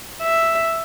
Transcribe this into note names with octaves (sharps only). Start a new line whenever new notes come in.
E5